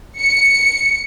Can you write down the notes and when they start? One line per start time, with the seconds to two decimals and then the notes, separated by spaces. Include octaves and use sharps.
0.19 C#7